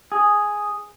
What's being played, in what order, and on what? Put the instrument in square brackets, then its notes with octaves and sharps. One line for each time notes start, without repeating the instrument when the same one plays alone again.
[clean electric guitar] G#4